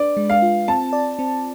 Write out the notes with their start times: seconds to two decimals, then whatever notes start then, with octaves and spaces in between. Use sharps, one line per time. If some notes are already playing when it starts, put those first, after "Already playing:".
Already playing: D4 B4 D5
0.17 G#3
0.30 F5
0.42 F4
0.68 C4 A5
0.93 D5
1.19 C4